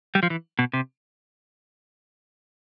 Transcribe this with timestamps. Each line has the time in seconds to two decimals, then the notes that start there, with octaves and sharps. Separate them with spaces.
0.15 G3
0.23 F3
0.30 E3
0.59 B2
0.73 C3